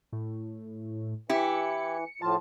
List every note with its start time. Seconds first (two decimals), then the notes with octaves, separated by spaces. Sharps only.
0.12 A2
1.29 E3 E4 G4 C#7
2.22 A2 F3 F4 A5